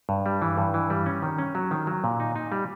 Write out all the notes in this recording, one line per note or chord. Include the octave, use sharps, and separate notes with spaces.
G2
G3
E3
G2
E3
G3
C#4
D#3
C#4
F#3
D#3
F#3
A#2
D#4
D#4
G3